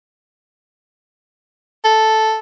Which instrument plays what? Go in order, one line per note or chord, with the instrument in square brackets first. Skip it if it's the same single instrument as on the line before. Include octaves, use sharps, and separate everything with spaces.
[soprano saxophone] A4